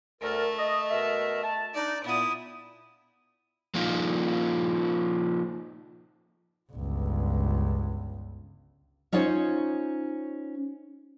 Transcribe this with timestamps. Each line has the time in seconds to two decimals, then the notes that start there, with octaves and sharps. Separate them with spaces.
0.22 D2 A3 A4 A#4
0.58 D#5
0.90 B2 A#4 E5
1.43 A5
1.74 D4 D#4 D5
2.04 A#2 B3 E4 D#6
3.74 F3 A#3 D#4 F4
6.72 G1 C#2
9.12 C#4 D#4 F4 C5 C#5